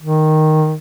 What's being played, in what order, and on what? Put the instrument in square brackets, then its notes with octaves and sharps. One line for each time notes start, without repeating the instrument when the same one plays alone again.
[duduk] D#3